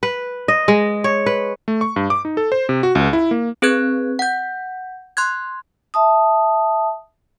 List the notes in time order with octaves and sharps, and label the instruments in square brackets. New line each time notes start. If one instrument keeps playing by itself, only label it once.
[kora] B4
D#5
G#3
C#5
B4
[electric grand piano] A3
C#6
G2
D6
D#4
A4
C5
C3
F#4
C#2
E4
A#3
[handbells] C4 G#4 B4 F#6 G#6
F#5 G6
C6 F#6 G#6
[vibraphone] E5 A5 D#6